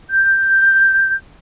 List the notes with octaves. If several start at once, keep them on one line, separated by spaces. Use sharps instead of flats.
G6